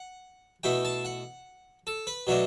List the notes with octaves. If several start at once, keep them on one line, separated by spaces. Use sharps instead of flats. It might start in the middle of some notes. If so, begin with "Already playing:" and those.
Already playing: F#5
B2 A3 E4 G5
A5
F#5
A4
B4
B2 F#3 A3 D4